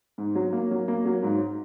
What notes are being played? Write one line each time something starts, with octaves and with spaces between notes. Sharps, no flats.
G#2
F#3
A#3
F#3
A#3
F#3
G#2